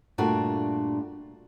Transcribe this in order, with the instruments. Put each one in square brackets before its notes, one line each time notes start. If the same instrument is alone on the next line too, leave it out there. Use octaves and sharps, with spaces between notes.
[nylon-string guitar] G2 A#2 A3 D4 F#4